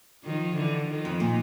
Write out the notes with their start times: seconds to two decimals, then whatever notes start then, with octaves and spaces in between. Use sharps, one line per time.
0.24 D#3 F3
0.56 D3 E3
0.89 D#3 F3
1.05 F2
1.20 A#2